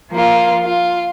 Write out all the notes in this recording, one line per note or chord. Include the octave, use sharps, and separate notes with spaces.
F3 A#3 F4
F4